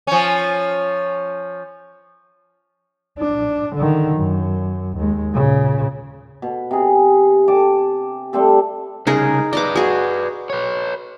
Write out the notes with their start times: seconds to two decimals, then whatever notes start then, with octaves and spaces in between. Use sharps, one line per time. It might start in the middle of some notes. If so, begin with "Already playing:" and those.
0.07 F3 C#4
3.20 D4
3.76 D3 D#3
4.16 F#2
4.97 D#2 G#3
5.34 A#2 C#3
6.42 B2
6.71 C3 G#4
7.48 G5 A5 D6
8.33 G3 A3 C4 A4
9.07 C2 C#3 D#4 G#4 A#4
9.53 B4 D5 D#5 A#5 D6
9.76 F#4 G#4
10.50 B4 C#5